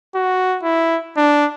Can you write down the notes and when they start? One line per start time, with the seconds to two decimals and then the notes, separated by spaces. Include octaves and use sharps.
0.15 F#4
0.63 E4
1.17 D4